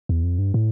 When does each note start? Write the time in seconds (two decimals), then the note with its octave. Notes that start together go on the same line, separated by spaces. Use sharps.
0.09 E2
0.23 F2
0.38 G2
0.54 A2